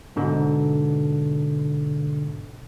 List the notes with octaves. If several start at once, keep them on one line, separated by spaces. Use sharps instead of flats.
G#2 B2 D3